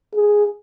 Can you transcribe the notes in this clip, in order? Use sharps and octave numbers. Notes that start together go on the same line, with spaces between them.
G#4